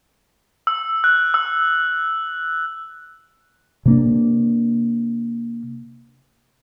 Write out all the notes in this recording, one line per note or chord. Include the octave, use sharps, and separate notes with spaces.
E6
F#6
E6
C3 A#3 D4